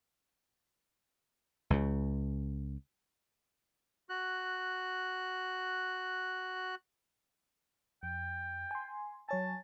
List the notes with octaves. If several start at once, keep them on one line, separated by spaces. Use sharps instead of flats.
C#2 C#3
F#4 F#6
F2 G5
G#5 C6
F#3 C#5 G#5 A5